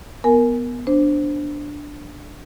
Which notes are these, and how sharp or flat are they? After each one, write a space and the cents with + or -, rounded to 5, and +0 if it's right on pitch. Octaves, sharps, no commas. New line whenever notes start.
B3 -5 A#4 +0 G#5 +15
D4 +0 C5 +0